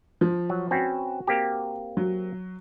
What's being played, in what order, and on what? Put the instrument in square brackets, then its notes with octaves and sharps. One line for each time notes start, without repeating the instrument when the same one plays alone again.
[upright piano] F3
[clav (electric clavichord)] F#3
[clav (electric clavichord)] C4 C#4 B4 [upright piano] F#4
[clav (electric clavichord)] A#3 C4 G4
[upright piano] F#3